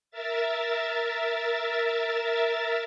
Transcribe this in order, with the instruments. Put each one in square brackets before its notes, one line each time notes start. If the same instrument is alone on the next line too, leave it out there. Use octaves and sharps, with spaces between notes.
[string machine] A#4 E5 A6